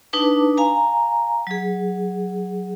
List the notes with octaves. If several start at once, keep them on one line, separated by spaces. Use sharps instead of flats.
D4 D#4 B4 A5 D6
F5 G#5 A#5
F#3 G#4